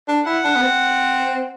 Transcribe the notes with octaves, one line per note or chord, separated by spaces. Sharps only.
D4
E4 F#5
D4
B3
C4